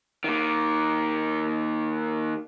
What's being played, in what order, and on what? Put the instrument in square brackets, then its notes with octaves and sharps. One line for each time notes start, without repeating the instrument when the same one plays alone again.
[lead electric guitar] D#3 A#3